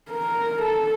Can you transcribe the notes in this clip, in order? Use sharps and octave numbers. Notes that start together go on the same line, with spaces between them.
A#4
A4